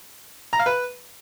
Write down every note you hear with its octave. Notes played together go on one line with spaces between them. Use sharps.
A#5
F5
B4